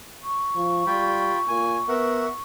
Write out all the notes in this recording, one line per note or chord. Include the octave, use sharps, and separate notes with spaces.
C#6
F3
G3 F4 G5 B5
A#2 G#5
B3 A#4 E5 F#5